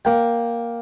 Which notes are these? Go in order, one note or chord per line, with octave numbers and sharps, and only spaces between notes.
A#3 G5